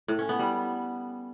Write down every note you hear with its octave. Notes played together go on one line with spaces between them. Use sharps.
A2
C#4
B3
G3